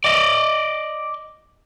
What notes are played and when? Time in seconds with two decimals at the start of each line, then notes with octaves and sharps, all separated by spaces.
0.04 D5 D#5